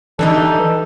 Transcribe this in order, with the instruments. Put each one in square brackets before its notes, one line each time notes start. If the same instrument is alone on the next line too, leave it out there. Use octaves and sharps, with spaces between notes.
[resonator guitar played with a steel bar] D3 G3 D#4 [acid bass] E3 [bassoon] A4